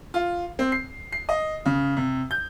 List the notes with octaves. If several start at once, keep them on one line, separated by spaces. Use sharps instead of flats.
F4
C4
C7
C7
D#5
C#3
C3
G6